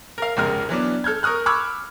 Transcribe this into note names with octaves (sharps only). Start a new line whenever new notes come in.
A#4 F5
F1 C#2 G#3 A#4 F6
E3 F#3 B3 D4
A4 F6 G6 G#6
A#4 C#6 D#6 F6 F#6
B5 C#6 D6 E6 F6 G#6